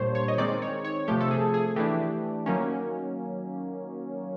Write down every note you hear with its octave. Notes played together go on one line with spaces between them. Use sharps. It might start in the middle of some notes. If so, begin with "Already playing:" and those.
Already playing: A#2 G3 A#3 D4 C5 C#5
C#5
D#5
D#3 G#3 C4 D#4 D5
C#5
C#5
C3 F3 A3 G4
A4
G#4
G#4
E3 A3 D4 G4
D#3 F#3 A#3 C#4